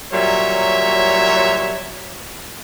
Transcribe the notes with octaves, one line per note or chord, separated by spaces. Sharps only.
A#2 F#3 G3 C#5 E5